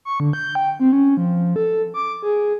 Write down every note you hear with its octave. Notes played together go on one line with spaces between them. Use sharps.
C#6
D3
G6
G5
C4
C#4
F3
A4
D6
G#4